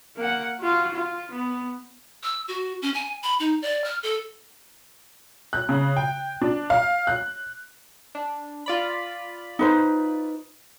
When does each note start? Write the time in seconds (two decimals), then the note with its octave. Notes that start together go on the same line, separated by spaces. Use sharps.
0.17 A#3 F#5
0.60 F4 F#4
0.96 F4
1.32 B3
2.23 E6
2.48 F#4
2.82 C#4
2.94 G#5
3.23 B5
3.40 D#4
3.62 D5
3.84 F6
4.03 A4
5.53 F#6
5.69 C#3
5.97 G5
6.42 D4
6.70 F5
7.07 F#6
8.15 D4
8.66 F4 D5 B5
9.59 D#4 B4 C5